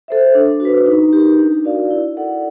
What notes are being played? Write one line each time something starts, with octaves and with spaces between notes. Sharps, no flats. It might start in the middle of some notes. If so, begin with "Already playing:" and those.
A4 C5 E5
D4
F#4
B4
D#4
G4 A#4
D4
F#4 A#4 D5 F5
E4
A4 D5 F#5